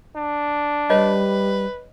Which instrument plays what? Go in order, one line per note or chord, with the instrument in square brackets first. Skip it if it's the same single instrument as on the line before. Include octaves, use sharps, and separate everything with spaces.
[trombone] D4
[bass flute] G3 [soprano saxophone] B4 [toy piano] C#5 D#5